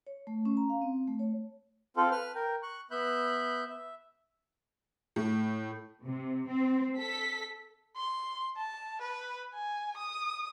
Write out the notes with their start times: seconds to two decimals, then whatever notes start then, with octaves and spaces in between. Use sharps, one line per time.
0.07 C#5
0.27 A3
0.45 C#4
0.57 A#5
0.69 F5
0.82 C4
1.07 A3
1.19 C#5
1.97 C4 F4 A4
2.12 B4 F6
2.35 A#4 G5
2.63 C#6 F#6
2.91 B3 E5 B5 F#6 G6
3.70 E5
5.16 A2
6.04 C3
6.48 C4
6.97 A4 B6
7.97 C6
8.57 A5
9.01 B4
9.54 G#5
9.97 D#6